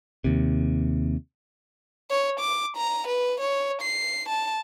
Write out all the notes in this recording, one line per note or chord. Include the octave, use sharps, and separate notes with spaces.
D#2 C3
C#5
D6
A#5
B4
C#5
C7
A5